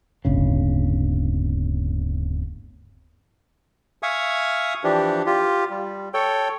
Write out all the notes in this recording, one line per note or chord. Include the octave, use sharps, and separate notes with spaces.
D1 G1 C#3
E5 F5 G#5 C#6 D#6
E3 F3 D4 G4
F4 G4
G3
A4 C#5 G5